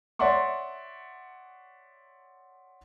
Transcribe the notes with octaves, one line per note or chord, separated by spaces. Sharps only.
C#5 D5 E5 F#5 C6 C#6